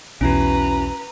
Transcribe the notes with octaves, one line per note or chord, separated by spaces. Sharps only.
B1 E2 C#4 E4 F#4 B4 A#5